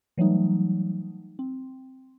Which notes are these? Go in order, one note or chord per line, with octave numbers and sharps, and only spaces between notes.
E3 F#3 G3 A3 D#4
C4